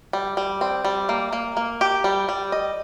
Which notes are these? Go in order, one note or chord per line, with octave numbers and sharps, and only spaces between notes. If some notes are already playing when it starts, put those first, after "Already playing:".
G3
G3
C4
G3
A#3
A#3
A#3
G4
G3
G3
D#5